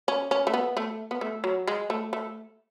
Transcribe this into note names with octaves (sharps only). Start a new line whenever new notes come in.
C#4
C#4
A3
B3
A3
B3
A3
F#3
G#3
A3
A3